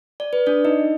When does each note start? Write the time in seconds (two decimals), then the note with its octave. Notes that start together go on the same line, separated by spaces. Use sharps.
0.20 D5
0.33 B4
0.47 D4 D5
0.64 D#4 D#5